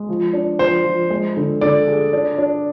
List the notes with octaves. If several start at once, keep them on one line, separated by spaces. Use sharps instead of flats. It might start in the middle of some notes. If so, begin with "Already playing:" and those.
Already playing: G#3
F3
D4
F3 C5
F3
G#3
D3
D3 D5
G#4
D4
D4